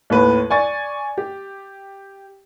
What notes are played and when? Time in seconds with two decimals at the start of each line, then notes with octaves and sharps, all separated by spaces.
0.10 D#2 A2 B4
0.50 D5 G#5 C#6 A6
1.18 G4